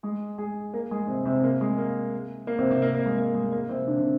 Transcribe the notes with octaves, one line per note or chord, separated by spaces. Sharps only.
G#3 G#4
G#3 G#4
A#3 A#4
G#3 G#4
C3 C4
C3 C4
A#3
G#3
A#3
A#3
C3 C4
C3 C4
A#3
A#3
G#3
A#3
G#3
A#3
C3 C4
D3 D4
C3 C4